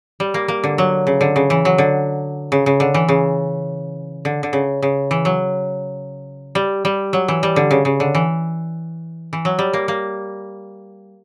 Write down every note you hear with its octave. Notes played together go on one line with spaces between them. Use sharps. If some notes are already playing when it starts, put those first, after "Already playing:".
G3
A#3
A#3
D3
F#3
C#3
D3
C#3
E3
F#3
D3
C#3
C#3
D3
E3
C#3
D3
D3
C#3
C#3
E3
F#3
G3
G3
F#3
E3
G3
D3
C#3
C#3
D3
E3
E3
F#3
G3
A#3
A#3